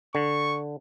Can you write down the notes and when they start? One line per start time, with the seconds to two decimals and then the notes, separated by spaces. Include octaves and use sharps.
0.15 D3 C#6